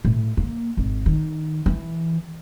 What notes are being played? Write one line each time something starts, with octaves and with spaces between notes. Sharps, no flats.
A2
A#3
G#1
D#3
E3